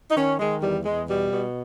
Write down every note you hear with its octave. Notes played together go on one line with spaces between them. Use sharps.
D#4
D#3 C#4
D#3 G#3
E2 G3
E2 G#3
B2 G3
B2